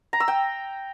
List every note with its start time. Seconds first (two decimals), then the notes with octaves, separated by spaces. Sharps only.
0.13 A#5
0.20 E6
0.28 G5